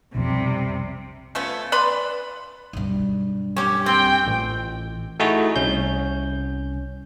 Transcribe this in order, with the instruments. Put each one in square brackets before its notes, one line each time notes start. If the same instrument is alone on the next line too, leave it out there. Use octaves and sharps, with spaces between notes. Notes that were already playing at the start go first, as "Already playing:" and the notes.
[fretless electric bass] B1 F2 [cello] C3 G3
[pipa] F3 A3 B3 C#4
B4 D5 B5 C6
[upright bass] B1 G2
[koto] C#4 G4
[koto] C4 [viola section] G5
[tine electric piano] A1
A3 D#4 E4 F#4 G#4
C2 C#4 G6